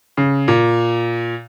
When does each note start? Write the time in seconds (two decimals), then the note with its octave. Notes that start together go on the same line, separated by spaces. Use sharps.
0.17 C#3
0.48 A#2